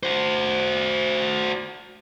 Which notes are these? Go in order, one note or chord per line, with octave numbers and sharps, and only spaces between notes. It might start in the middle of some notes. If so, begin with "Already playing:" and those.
F#4 C5